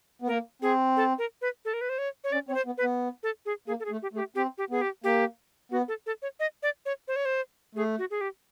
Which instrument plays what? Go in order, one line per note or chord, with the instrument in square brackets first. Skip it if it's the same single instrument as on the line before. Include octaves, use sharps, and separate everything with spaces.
[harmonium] B3
[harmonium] A#3 [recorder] A#4
[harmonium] C4 [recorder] G#4
[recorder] A4
A#4
B4
A4
A#4
B4
C5
C#5
C#5
[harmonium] C#4 [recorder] D5
[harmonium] C4 [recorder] C#5
[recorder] C5
[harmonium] B3
[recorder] B4
[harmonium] B3
[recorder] A4
G#4
[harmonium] A#3 [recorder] G#4
[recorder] A4
G#4
[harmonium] A3
[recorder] G4
[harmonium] A3 [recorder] G#4
[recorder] G4
[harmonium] C4 [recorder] G4
[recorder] G4
[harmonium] B3 [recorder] G#4
[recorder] G4
[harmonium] A#3 [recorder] G4
[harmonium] B3 [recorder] F#4
[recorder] A4
A4
C#5
D#5
D5
C#5
C5
C#5
C5
[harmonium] A3 [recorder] G#4
[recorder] F#4
G#4
G4